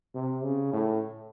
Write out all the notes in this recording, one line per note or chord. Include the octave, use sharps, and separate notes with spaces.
C3
C#3
A2